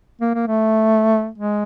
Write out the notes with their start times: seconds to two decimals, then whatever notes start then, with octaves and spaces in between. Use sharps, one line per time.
0.21 A#3
0.35 A#3
0.47 A3
1.38 G#3